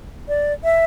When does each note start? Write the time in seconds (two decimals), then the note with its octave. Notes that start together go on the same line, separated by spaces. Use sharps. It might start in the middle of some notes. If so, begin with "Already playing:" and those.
0.28 D5
0.64 E5